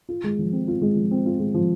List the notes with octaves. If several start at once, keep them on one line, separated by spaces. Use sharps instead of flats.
F4
G#3
F3
C4
F4
G#3
F3
C4
F4
G#3
F3